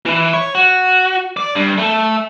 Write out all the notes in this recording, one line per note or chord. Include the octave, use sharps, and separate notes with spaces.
E3 E4
C#5
F#4
D5
G2
A3 A4